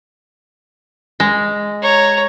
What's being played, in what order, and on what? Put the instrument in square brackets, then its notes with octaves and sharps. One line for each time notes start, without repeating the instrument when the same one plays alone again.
[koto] G#3
[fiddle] C#5 A#5